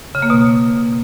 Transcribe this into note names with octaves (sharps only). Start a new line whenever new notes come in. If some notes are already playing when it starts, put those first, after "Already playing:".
C#3
A#3
B2